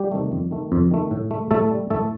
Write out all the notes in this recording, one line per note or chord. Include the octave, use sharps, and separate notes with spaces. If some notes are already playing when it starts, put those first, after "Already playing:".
Already playing: G3 G4
C3 D#3 A3
F2
D#3 A3
F2
D#3 A3
A2
A3
A2 A3 A4
G3
A2 A3 A4